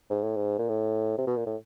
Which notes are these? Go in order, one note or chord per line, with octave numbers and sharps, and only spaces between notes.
G#2
A2
G#2
A#2
A2
C3
B2
A#2
A2